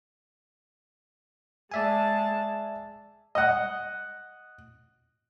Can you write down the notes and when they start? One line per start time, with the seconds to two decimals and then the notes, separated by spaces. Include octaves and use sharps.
1.72 G#3 D5 E5 G#5 A5
3.35 D#5 F#5